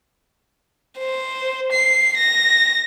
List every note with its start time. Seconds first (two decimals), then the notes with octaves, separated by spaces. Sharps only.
0.98 C5
1.72 C7
2.18 A#6